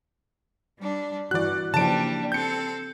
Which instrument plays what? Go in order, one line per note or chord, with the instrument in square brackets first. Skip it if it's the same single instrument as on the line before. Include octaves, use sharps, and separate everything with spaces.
[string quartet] G3 D4
[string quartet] G2 [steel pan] E3 F#4 [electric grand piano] D5 F#6
[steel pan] C#3 E3 F3 [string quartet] G3 A#3 D4 [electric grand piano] A5 D7
[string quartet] C4 A4 [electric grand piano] G6 C#7